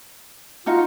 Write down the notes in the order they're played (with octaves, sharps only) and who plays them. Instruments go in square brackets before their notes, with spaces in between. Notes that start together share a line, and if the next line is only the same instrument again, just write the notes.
[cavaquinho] D#4 F#4 F5 [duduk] F4